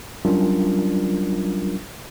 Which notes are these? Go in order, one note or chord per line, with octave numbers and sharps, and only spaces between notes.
F#3 G3 C#4 D4 F4 A#4